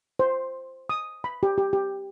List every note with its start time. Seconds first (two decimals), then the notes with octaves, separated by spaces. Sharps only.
0.19 C5
0.89 D#6
1.24 B5
1.43 G4
1.58 G4
1.73 G4